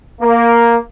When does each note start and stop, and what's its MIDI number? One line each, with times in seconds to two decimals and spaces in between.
0.21 0.77 58